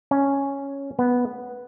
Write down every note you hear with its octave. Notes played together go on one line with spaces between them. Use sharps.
C#4
B3